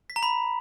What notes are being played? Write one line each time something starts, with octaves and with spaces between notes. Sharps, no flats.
B6
A#5
B5